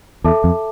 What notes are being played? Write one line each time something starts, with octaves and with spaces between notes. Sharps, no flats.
E2 A4 E5 A5 D6
F2